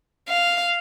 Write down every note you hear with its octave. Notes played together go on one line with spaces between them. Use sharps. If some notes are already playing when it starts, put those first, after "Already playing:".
F5